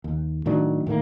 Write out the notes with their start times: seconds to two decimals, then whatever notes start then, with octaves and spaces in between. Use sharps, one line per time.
0.04 D#2
0.46 A2 D#3 F#3 D4
0.86 A2 D#3 A3 A#3